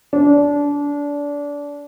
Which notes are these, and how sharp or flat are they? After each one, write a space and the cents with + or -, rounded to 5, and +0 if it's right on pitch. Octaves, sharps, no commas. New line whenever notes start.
D4 -25